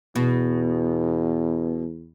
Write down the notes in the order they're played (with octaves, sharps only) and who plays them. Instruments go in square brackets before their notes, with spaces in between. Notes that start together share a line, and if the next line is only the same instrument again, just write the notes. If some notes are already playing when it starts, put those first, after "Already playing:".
[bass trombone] E2 [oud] B2